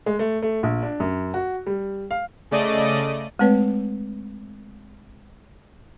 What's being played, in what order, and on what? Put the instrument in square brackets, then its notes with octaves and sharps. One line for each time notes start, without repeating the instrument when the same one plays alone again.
[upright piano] G#3
A3
A3
A#1
D4
F#2
F#4
G3
F5
[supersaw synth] C#3 A3 D5 D#5 D#7
[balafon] G#3 A3 C4 B4 C#5